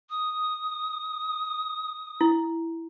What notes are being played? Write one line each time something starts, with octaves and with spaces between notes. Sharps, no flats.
D#6
E4